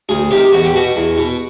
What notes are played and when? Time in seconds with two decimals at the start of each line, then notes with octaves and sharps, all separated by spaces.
0.09 D2 G#4
0.31 C3 D#3 G4
0.52 E2 F#4
0.64 G4
0.74 B2 F#4
0.96 E2
1.18 B2